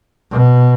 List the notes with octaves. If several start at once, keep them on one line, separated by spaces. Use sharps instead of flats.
B2